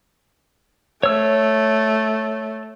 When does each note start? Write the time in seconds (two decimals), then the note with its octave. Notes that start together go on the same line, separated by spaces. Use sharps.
1.03 A3 C#5 E6